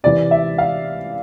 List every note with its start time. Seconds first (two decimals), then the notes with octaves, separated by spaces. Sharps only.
0.04 C3 E3 D5
0.31 E5
0.58 F5